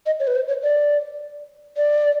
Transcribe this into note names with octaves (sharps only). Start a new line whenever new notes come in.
D#5
C#5
B4
C5
C#5
D5
D5